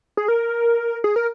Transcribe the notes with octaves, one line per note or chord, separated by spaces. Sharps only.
G#4
A#4
G#4
A#4